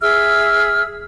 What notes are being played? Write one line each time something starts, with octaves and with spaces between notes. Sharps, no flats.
G#4 E5 E6 F6